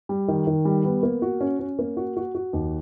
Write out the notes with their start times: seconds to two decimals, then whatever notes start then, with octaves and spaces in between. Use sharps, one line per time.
0.09 G3
0.28 D#3
0.47 D#3
0.65 G3
0.84 B3
1.03 A#3
1.22 F#4
1.41 C#4
1.59 C#4
1.79 A#3
1.97 F#4
2.17 F#4
2.35 F#4
2.53 D#2